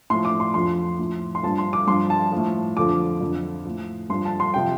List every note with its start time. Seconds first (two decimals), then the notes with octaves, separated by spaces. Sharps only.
0.10 A2 C6
0.14 F3
0.25 D6
0.40 C6
0.54 F2 F3 C6
0.99 A2 F3
1.35 C6
1.43 G2 F3 A5
1.58 C6
1.73 D6
1.87 G2 F3 C6
2.10 A5
2.32 A2 F3
2.77 F2 D3 F3 D6
3.21 F2 D3 F3
3.65 A2 F3
4.10 G2 C6
4.13 F3
4.25 A5
4.40 C6
4.54 C3 F3 G5